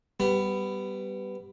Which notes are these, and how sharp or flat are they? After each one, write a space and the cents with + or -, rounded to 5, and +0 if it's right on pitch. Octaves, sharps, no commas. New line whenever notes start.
G3 -10 B3 +10